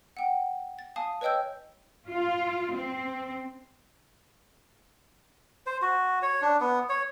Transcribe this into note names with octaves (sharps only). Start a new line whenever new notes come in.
F#5 G5
A6
F5 G#5 A5 D#6
B4 C#5 D#5 G5 E6 G6
F4
C4
C5
F#4
C#5
D4
B3
C#5